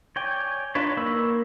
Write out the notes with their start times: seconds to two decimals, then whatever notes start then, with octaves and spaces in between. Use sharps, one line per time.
0.16 C#5 D5 G5 G#5
0.75 D4 D#4 F4 B4 C#5
0.97 A#3 B5 C#6 E6